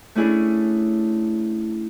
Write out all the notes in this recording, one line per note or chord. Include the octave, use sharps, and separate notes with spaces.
A3 C#4 D4 E4 G#4 A4